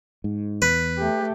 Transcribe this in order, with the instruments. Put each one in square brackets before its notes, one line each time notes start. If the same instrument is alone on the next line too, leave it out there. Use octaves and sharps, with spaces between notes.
[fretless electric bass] G#2
[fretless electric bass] E2 [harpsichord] B4
[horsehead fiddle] A3 G4